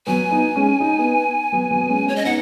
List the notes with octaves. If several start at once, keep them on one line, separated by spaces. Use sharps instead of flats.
F#3 B3 G#5
B3 D#4
G#3 C#4
D#4
B3 D#4
F#3 B3
F#3 B3
B3
G#3 C#4
G#3 C#4 C#5
D#5
B3 D#4 F#5